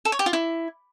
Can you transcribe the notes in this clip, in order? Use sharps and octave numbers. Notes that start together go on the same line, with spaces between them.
A4
C#5
G4
F4
E4